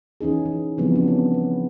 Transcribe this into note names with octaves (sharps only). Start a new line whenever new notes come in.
E3 C#4 D#4 G#4
E3
C#3 E3 F3 G3 B3 C4
C#4 D4
B3 C4
B4